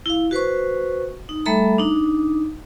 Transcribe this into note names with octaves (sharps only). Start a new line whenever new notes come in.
E4 F5
F#4 B4 C5 C#6
D#4
G3 A3 A4 E5 A#5 B5
D4 D#4